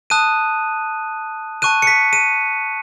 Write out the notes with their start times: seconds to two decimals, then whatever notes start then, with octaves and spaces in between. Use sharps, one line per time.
0.10 A5 D#6 F#6 D#7
1.62 A5 C#6 F#6 D#7
1.82 C#7
1.87 B6
2.13 D#7